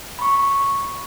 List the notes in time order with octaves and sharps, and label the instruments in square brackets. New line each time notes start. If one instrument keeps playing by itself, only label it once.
[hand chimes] B5 C#6